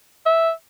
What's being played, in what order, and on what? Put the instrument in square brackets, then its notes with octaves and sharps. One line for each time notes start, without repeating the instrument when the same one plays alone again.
[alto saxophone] E5